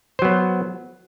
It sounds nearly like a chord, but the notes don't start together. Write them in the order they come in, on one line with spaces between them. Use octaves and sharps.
C5 F#3 B3